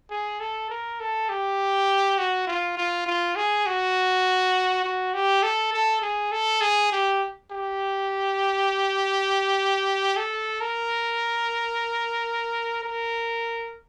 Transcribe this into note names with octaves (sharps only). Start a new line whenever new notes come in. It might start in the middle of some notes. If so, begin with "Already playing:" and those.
G#4
A4
A#4
A4
G4
F#4
F4
F4
F4
G#4
F#4
F#4
G4
A4
A4
G#4
A4
G#4
G4
G4
A4
A#4
A#4